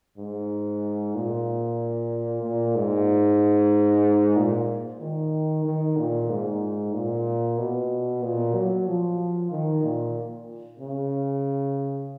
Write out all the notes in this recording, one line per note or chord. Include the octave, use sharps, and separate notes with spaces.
G#2
A#2
A#2
G#2
A#2
D#3
D#3
A#2
G#2
A#2
B2
A#2
F#3
F3
D#3
A#2
C#3